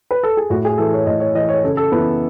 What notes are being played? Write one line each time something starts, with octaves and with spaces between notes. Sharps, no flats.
B4
A4
G#4
A2 F#4
G#4
E3 A4
C#5
A2 D#5
C#5
E3 D#5
C#5
C#3 A4
A4
E3 B3